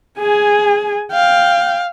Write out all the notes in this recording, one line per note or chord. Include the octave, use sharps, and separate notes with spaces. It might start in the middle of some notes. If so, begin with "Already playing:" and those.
G#4 G#5
F5 G5